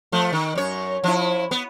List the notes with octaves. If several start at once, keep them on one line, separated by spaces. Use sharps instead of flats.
F3 A3
D#3
F#2 C#5
F3 E4
B3